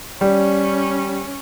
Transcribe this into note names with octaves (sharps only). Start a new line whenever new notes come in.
G3 C#4